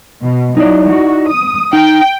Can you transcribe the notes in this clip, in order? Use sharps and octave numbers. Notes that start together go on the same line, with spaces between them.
B2
F#3 D#4 E4 D5
F#4
D#6
D#4 G5